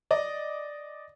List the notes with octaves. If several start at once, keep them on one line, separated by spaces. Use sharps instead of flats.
D5 D#5